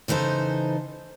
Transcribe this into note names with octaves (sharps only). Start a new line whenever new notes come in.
C#3 E3 D#4 A4 C5